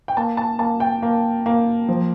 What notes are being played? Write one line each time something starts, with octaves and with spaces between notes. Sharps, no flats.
G5
A#3 A5
A5
A#3 A5
G5
A#3
A#3
F3